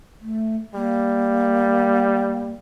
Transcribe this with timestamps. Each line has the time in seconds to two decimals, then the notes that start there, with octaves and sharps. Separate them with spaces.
0.21 A3
0.74 G3 A#3